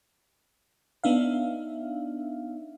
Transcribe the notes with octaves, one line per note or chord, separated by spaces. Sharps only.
B3 D4 D#4 E5 F5